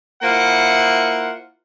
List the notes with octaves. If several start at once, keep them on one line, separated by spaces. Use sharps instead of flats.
A#3 E4 F4 C5 F#5